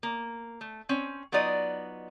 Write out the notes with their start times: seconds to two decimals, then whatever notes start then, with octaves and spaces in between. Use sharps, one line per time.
0.03 A#3
0.61 A3
0.89 C4 C#4
1.32 F#3 B3 D#4 F4 D5 D#5